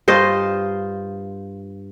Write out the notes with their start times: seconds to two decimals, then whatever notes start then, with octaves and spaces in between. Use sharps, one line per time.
0.08 G2 F4 C5 D#5